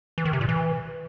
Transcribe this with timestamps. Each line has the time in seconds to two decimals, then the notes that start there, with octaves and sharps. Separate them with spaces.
0.18 E3
0.25 D#3
0.33 C3
0.41 A#2
0.49 E3